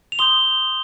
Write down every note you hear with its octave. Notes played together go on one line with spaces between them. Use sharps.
F7
C6 D#6 G6 G7